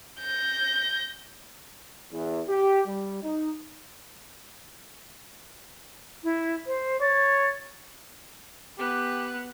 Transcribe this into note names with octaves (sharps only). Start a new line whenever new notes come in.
G6 A#6
E2
G4
G3
D#4
E4
C5
C#5 A6
B3 G4 F#6